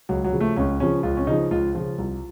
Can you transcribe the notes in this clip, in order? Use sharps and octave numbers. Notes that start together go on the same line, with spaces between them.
C#2 F#3
F#3
C#3 F3
A3
C#2 C#4
C#3 F3 C#4
C#2 F4
C#4
C#3 F3 D#4
C#2 F4
C#3 F3 F4
C2